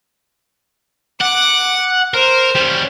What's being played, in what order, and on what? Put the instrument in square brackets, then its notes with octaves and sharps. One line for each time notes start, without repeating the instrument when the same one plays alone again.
[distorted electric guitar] F#5 [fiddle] D6
[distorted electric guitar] A#4 [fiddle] C5
[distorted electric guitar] G3 C#4